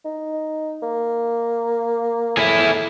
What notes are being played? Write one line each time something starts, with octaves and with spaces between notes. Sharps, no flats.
D#4
A#3
A2 E4 G#4